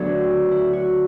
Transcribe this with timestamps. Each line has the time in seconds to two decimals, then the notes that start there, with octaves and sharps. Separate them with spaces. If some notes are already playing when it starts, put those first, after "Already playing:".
Already playing: D2 D3 F#3 B3 D4
0.51 E4
0.73 F#4